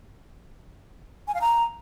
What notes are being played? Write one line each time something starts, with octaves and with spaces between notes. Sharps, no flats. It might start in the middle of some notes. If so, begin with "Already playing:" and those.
G#5
F5
A#5